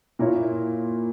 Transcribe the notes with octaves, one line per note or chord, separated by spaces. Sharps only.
A#2 A#3 E4 A#4 C#5